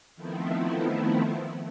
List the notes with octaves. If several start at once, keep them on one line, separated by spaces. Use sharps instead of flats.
D#3 F3 A3 B3 C4 E4